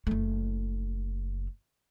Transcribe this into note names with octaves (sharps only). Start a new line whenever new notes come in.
F#1 A3